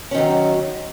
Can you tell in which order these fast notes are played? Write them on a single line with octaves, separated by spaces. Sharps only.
C#4 D#3 F#3